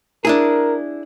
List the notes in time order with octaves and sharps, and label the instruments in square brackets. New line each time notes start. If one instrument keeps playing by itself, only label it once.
[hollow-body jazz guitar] D4 E4 G#4 [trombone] A#4